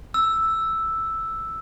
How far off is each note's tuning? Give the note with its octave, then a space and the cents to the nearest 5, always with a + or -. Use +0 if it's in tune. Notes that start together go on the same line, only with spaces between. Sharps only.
E6 +0